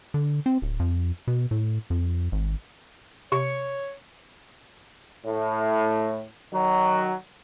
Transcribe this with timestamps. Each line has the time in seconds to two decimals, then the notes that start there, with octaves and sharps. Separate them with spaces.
0.14 D3
0.46 C4
0.62 D1
0.80 F2
1.27 B2
1.51 A2
1.90 F2
2.32 G#1
3.32 C3 C#5 C#6
5.26 A2
6.53 D#3 F#3